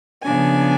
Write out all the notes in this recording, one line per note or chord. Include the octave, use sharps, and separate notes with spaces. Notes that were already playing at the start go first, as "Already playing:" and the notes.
C#3 F3 B3 D4 G#5